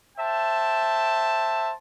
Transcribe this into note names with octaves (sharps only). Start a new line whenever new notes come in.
C5 E5 G5 A5